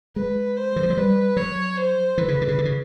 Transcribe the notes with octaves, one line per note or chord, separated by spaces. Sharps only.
G#3 B4
C5
E3
F3
F#3
G3 B4
F#3 C#5
C5
E3 B4
C#3
D3
C#3
D3
C#3